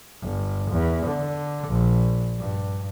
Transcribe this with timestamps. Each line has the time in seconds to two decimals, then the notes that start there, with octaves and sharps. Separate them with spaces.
0.21 G1
0.71 E2
1.06 D3
1.68 A#1
2.39 G2